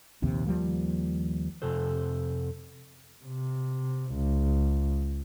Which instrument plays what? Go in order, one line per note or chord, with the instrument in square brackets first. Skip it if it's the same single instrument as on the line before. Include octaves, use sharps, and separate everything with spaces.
[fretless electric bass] A#1 D#2 C3
D#2 F3 G3 A#3
[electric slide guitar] F2 C3 A4 C5
[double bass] C3
C#2